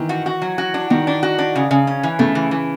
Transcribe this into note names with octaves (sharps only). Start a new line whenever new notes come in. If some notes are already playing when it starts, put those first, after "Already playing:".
Already playing: D#3 E3
F#4
F#4
F#3
F#4
D4
D#3 F#4
D4
F#4
D4
C#3
C#3
C#4
E3
C#3 A3
E3
E3